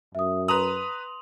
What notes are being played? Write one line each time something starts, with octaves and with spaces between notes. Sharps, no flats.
F#2 E5 D#6
B4 A#5 C6 D#6 F7 F#7